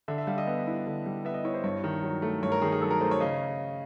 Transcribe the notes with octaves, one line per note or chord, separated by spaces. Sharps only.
D3 E5
E5
G3 F5
D#5
B3
E4
D3
G3
B3 E5
D#5
E4 C#5
C5
G2 C#5
D#3
F#3
A3
G2 C#5
A#4
D#3 G#4
G#4
F#3 A4
A#4
A3 C5
C#5
C#3 D#5